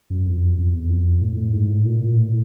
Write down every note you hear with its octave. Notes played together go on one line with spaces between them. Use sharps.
F#2
F2
F2
E2
F2
A2
A2
G#2
A2
A#2
A#2
A2